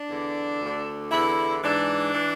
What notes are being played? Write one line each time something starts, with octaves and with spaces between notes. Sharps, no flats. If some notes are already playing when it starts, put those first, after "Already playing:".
Already playing: D4
E2 D3
D2
D3
E2 D3 E4
G#2 E3 D4
E3